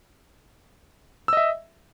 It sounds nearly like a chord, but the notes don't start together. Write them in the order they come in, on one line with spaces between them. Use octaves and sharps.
E6 D#5 E5